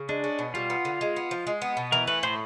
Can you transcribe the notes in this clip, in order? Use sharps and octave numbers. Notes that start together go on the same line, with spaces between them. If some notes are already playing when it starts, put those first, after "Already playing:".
Already playing: C#3
G#3 D4
C#4
B2
G3 F4
B3
D3
G#3
B3
F3
G#3
B3
B2
E3 A#4
A3 B4
A2 C5